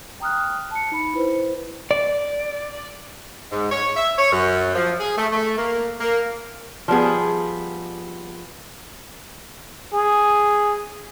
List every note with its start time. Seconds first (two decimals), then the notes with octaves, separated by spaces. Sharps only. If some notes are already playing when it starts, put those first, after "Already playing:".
0.20 G5 A#5 D#6 F6 F#6
0.71 A5 C#7
0.92 D#4 B5 C#7
1.14 E4 B4 C5
1.91 D5
3.52 G#2
3.71 C#5
3.97 E5
4.18 C#5
4.32 F#2
4.75 F3
5.00 G#4
5.18 A3
5.33 A3
5.58 A#3
6.01 A#3
6.88 F3 G3 B3 G#4
9.93 G#4